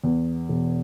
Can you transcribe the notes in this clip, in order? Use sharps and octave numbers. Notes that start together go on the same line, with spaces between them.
E2
E1